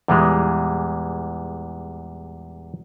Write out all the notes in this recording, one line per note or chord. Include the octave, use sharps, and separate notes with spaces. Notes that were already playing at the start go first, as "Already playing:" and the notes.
E2 A#2 E3 G3 G#3